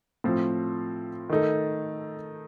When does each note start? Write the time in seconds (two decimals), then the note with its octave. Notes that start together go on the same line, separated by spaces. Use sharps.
0.24 A2 F3 C4
1.30 D#3 A3 D#4 A4